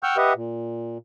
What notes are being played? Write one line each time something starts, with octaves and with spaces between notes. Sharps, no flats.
F#5 G5 C#6 E6 F6 G6
G4 B4 D#5 E5 F#5
A#2